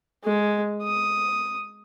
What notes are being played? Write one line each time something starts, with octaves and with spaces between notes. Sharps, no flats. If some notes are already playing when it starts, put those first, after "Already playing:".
G#3
D#6